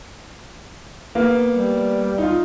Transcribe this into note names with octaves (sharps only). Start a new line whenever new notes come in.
A#3 B3
G3
D#4 F4